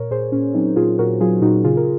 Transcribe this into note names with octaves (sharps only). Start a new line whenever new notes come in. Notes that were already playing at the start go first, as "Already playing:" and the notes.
Already playing: A#2 A#4 C#5
A#2 G#4 C5
A#2 C#4
F#3 C4 D#4
A#2 F4 G#4
A#2 F#4 A#4
F#3 F4 G#4
A#2 D#4 F#4
C#3 F4 G#4
A#4